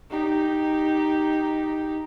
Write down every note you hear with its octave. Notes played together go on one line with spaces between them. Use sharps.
D#4 G4